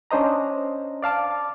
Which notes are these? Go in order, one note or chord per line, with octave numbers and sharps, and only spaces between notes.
C#4 D4 C5 D#5 A#5
D5 F5 A5 D6